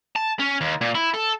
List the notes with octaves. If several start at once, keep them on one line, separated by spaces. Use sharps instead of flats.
A5
C#4
D#2
A#2
E4
A4